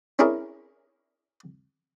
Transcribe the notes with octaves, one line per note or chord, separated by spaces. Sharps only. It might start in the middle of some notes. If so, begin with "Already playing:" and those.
C#4 D4 E4 G#4 A#4 C#5